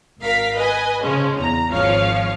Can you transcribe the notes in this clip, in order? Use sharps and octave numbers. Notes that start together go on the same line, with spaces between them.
G#1 A#4 F5 B6
B4 D#5 G#5
C#3 F3 G#3 C#4
E2 A#5
G#1 F3 C#5 F5